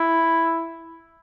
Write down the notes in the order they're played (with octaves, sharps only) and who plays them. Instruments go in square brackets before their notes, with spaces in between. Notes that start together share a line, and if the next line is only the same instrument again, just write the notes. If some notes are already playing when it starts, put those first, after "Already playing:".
Already playing: [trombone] E4